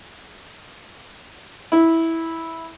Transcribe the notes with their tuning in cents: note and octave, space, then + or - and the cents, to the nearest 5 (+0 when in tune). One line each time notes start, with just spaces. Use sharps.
E4 -10